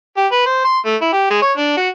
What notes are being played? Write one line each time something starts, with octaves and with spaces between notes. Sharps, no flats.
G4
B4
C5
C6
A3
E4
G4
G#3
C#5
D4
F#4